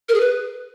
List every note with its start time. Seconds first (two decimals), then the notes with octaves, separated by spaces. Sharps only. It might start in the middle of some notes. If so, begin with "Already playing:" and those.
0.09 A#4
0.14 G#4
0.20 B4